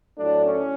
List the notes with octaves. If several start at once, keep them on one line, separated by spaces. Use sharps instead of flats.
A2 F#3 A3 D4
C#4